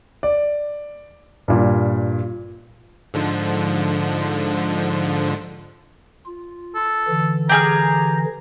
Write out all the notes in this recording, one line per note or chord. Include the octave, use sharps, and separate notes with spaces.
D5
G2 A#2
G#2 D3 F3
F4
A4
D3 E3
G4 G#4 A#5 F6